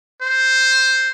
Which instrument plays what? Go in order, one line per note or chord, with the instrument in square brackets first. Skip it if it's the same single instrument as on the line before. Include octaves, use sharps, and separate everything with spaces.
[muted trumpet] C5